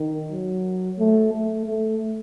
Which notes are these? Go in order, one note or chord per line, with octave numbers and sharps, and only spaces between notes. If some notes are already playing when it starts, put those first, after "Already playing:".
Already playing: D#3
F#3
A3
A3
A3